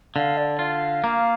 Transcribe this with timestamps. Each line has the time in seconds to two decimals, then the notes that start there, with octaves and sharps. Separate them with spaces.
0.15 D3 F5
0.37 D5
0.59 F4 F5
1.04 A#3